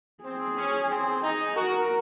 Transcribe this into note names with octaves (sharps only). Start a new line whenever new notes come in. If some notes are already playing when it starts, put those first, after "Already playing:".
C4 G#4
C#4
C4
D#4 G#4
F#4 A#4